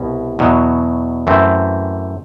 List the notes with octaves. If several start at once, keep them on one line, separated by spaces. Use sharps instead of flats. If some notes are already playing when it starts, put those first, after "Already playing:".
Already playing: C2 B2
E2 B2 F#3
F#2 E3 A3 C4